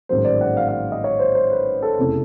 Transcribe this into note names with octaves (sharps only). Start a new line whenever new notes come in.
A1 G#2 D#3 F#3 A#3 C5
D5
F#5
F5
F5
D#5
C#5
C5
C5
B4
A4
F1 E2 C#3 E3 A3